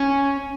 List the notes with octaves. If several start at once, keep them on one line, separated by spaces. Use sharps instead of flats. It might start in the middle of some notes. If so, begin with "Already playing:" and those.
Already playing: C#4